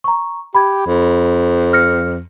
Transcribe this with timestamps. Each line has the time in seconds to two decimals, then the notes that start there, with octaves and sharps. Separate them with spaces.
0.04 A#5 C#6
0.55 G4 B5 G#6
0.86 F2
1.73 F6 A#6 C#7